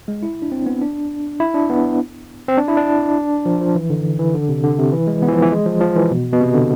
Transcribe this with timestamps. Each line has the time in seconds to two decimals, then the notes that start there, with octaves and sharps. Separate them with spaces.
0.08 G#3
0.23 E4
0.42 D4
0.52 C4
0.66 B3
0.82 D4
1.40 E4
1.54 D4
1.69 B3
2.48 C4
2.58 D4
2.68 E4
2.77 D4
3.46 F3
3.61 F3
3.75 E3
3.90 D3
4.19 E3
4.34 D3
4.49 C3
4.64 D3
4.78 C3
4.92 E3
5.07 G#3
5.22 B3
5.28 E3
5.32 F3
5.42 E3
5.52 G#3
5.66 F3
5.81 F3
5.96 E3
6.11 B2
6.33 B2
6.41 C3
6.54 D3